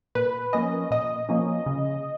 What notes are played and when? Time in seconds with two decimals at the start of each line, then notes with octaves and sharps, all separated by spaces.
0.15 A#2 B4
0.53 F3 A#3 C#4 D#5
0.91 A#2 D#5
1.29 F3 A#3 C#4
1.66 C#3